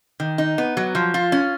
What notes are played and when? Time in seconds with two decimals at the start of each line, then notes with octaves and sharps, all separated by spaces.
0.20 D#3
0.38 D#4
0.58 B3
0.77 F#3
0.95 F3
1.14 F4
1.32 C#4